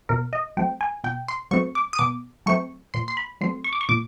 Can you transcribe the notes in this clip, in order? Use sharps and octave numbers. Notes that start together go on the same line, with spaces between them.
B2 A#4
D#5
F#3 A3 C4 G5
G#5
B2 G5
C6
F#3 A3 C4 C#6
D6
D#6
B2 D6
F#3 A3 C4 C#6
A#2 C6
C6
B5
F#3 A3 C4 C6
C#6
D6
C#6
A#2 D6